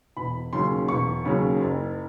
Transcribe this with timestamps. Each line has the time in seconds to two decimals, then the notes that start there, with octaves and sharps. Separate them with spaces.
0.17 E1 B5
0.53 D#2 C#3 F#3 C6
0.88 E1 C#6
1.25 D#2 C#3 F#3
1.61 F#1